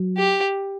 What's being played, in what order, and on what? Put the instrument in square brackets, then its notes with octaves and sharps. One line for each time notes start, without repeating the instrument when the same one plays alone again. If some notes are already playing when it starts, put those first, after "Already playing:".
Already playing: [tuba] F#3
[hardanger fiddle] G4